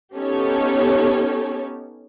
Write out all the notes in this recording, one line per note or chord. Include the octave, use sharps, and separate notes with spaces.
B3 C#4 D#4 G4 A4 C#5